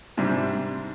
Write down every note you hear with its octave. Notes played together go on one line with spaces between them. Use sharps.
G#2 C3 G3 C4 D4